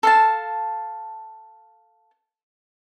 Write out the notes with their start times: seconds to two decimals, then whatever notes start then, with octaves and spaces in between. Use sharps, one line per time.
0.03 A4 F5 A5